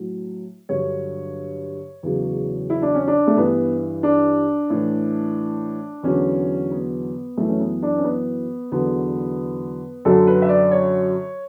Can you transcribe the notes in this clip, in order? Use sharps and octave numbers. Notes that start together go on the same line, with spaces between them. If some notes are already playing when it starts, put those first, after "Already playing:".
Already playing: A2 F#3
G2 D3 F#3 C#5
E2 C#3 F#3
E4
D4
C#4
D4
A3
G2 E3 B3
D4
A2 E3
E2 D3 F#3 C#4
B3
F#2 E3 A3
C#4
B3
D4
C#4
B3
E2 D3 F#3 B3
F#2 D3 F#3 A4
B4
E5
D5
C#5